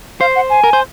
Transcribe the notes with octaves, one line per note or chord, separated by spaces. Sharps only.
C5 F5
F#5
G#5
A#4
C5